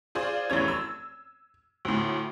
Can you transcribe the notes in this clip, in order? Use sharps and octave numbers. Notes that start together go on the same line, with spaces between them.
F4 G#4 C5 D5
F1 F#2 E3 C#4 G#6
E6
D2 A2